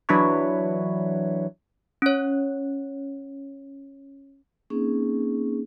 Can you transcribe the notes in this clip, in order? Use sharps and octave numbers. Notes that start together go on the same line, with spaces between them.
E3 F#3 D4 E4 B4 C#5
C#4 C#5
A#3 C4 C#4 D#4 G#4